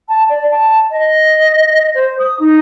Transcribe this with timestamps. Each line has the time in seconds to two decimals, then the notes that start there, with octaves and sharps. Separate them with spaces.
0.08 A5
0.29 D5
0.51 A5
0.90 D#5
1.94 C5
2.19 D#6
2.39 D#4